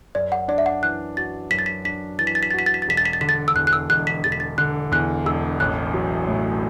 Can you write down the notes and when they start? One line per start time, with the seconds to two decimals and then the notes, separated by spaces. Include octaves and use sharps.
0.15 F#2 D5
0.32 F#5
0.48 D4 D5
0.58 E5
0.66 F#5
0.82 E3 F#6
1.17 F#4 A6
1.50 F#2 B6
1.59 A6
1.66 B6
1.85 D4 B6
2.19 E3 A6
2.27 B6
2.35 A6
2.43 B6
2.51 A6
2.54 F#4
2.59 B6
2.66 A6
2.74 B6
2.82 A6
2.88 E1 B6
2.97 A6
3.05 B6
3.13 A6
3.21 D3 B6
3.29 A6
3.48 E6
3.55 E2 F#6
3.67 F#6
3.73 E6
3.89 E1 F#6
4.07 B6
4.24 E1 A6
4.32 B6
4.40 A6
4.58 D3 F#6
4.92 E2 F#6
5.26 E1 E6
5.60 A1 F#6
5.94 F#3
6.28 A2